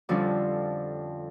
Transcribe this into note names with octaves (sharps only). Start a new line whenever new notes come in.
F2 D3 F3 G3 C#4